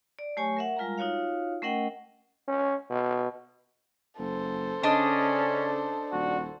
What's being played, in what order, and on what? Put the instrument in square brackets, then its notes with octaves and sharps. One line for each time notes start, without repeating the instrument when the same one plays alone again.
[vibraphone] D5
F#3 A3 G4 C#5 G#5 C#6
A#4 E5 F#5
G3 G#3 F4 A#4 F5 A#5
D#4 F4 F#4 C#5 F5
A3 C#4 A#4 D#5 F#5 G5
[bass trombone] C#4
B2
[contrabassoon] F#1 [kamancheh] A4 C5
[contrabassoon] C#3 [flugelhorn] C#4 [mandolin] D4 D#5
[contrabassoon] D#1 [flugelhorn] F#4